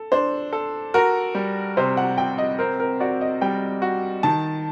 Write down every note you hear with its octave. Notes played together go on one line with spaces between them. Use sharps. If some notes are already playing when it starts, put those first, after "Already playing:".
Already playing: A4
D4 C5
A4
F#4 A#4
G3
C3 C5
F#5
C3 G5
D#5
C4 A#4
A#4
F#4 D5
D#5
G3 G5
F#4
D#3 A5